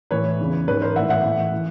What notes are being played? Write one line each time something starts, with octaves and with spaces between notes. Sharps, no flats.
A2 E3 B4 C#5
E2 C#3 E3
G#2 E3 B4 C#5
A#4 C5
A2 E3 E5 F#5
E5 F#5
A2 E3
E3